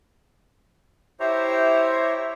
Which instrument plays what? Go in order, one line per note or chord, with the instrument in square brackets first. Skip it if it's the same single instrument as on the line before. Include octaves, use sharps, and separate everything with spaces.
[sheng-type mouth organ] E4 G4 C5 C#5 E5 A#5